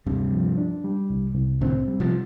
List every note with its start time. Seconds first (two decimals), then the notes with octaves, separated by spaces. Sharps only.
0.06 D2 G2 C3
0.32 F3
0.58 D4
0.84 G3
1.10 C2
1.35 C2
1.61 A2 D3 C4
1.87 G3
2.00 C3 F3